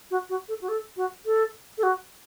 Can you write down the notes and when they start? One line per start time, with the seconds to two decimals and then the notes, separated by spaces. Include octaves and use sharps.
0.11 F#4
0.30 F#4
0.48 A4
0.61 F#4
0.68 A4
0.97 F#4
1.26 A4
1.78 A4
1.83 F#4